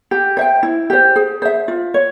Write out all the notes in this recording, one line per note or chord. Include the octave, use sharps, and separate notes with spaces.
G4
C5 E5 G5
E4
G4 C5
G#4
C5 E5
F4
C#5